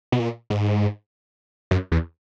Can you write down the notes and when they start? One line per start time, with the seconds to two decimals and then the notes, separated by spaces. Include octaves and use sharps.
0.12 B2
0.19 A#2
0.50 G#2
1.71 F#2
1.92 E2